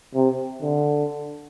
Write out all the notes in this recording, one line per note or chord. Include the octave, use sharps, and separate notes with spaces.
C3
D3